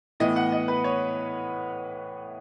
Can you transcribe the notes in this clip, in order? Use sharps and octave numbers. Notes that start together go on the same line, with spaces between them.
A2 E3 B3 D#5
F#5
D#5
B4
C#5